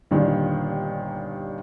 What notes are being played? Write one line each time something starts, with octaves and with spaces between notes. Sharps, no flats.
G1 A#2 D#3 D4 G4